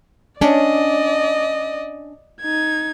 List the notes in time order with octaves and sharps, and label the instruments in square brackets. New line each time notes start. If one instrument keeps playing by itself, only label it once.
[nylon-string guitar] C#4 D4 [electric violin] D5 D#5
[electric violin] D#4 G#6